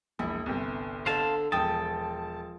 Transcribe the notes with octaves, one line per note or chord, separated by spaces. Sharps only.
E1 A#1 E4
G1 C2
D3 A4 C5 D#5 F5 A5
E1 F3 G5 A5 D#6